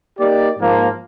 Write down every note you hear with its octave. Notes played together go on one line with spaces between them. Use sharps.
A#3 D#4 G4 D5
G#2 F3 A#3